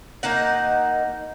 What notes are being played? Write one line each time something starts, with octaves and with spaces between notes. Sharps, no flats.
A#3 D#4 F#5